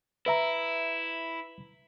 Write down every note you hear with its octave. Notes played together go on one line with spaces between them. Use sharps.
E4 B4 E5 A#5